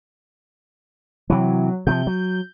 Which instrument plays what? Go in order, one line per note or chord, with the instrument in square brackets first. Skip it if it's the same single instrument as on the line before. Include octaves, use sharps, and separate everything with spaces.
[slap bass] C3 E3 [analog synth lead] F#3
[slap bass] C3 E3 F3 [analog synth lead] G6
[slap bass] F#3